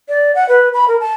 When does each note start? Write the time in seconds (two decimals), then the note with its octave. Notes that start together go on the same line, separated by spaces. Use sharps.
0.09 D5
0.35 F#5
0.49 B4
0.74 B5
0.88 A#4
1.00 A5